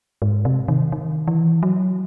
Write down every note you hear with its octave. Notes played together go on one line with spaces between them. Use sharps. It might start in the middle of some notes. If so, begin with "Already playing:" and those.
G#2
C3
D#3
D#3
E3
F#3